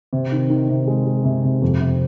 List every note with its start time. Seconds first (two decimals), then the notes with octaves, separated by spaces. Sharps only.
0.13 C3
0.32 D#3
0.50 D#3
0.69 C3
0.87 G#3
1.06 G#3
1.24 C3
1.44 C3
1.62 F2
1.80 C3